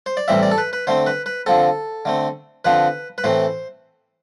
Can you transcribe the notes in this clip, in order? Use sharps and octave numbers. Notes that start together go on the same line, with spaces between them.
C5
D5
A2 E3 G3 C4 E5
D5
A4
B4
B4
D3 A3 C4 C5
B4
B4
D3 F3 C4 A4
D3 A3 C4
D3 F3 C4 B4
B4
A2 E3 A3 C4 C5